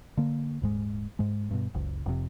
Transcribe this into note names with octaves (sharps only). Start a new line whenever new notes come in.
D3 A#3
D#1 G#2 G#3
G#2 G#3
G2 B2
F#1 C#2
F1 F2 A2 C3